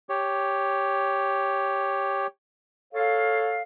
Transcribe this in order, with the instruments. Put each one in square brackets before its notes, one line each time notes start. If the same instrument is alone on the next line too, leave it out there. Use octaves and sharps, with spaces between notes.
[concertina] G4 C#5
[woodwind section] A4 C#5 F5